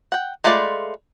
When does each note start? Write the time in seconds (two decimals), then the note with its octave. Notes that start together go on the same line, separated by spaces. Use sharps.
0.12 F#5 G5
0.44 G#3 A3 F4 B4 D5